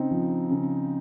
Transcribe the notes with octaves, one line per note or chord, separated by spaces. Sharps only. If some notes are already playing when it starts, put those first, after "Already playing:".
Already playing: C#3 C4 D#4
F3
C#3